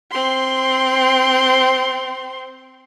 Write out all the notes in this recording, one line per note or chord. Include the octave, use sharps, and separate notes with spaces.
C4 C6